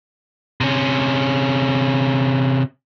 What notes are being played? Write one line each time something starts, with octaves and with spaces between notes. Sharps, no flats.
C3 C#4